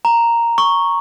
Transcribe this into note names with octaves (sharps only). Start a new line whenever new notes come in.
A#5
C#6